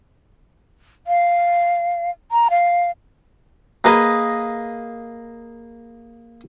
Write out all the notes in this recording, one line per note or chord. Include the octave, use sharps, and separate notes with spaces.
F5
A#5
F5
A#3 G#4 B4 D#5 A#5